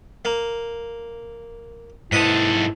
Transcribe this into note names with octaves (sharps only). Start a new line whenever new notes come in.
A#3
G#2 E4 A4 B4 D#6